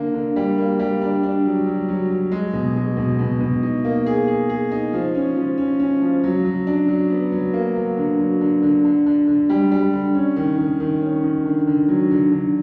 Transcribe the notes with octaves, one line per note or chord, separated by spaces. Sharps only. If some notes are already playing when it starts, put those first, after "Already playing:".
Already playing: D3 A#3
D3
G3
A#3
G3
D4
D4
F#3
F#3
F#3
F#3
G#3
B2
G#3
B2
B2
B2
D#4
A#3
G#4
G#4
G#4
D#4
F3
C#4
F3
C#4
C#4
F3
F#3
F#3
D4
F#3
B3
F#3
A#3
F#3
D3
F#3
D3
D3
D3
D3
D3
G3
G3
D3
C#4
D#3
D#3
D#3
C#4
D#3
D3
D3
F#3
D3
D3